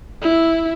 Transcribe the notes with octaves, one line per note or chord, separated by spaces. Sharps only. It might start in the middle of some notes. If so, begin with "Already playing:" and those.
E4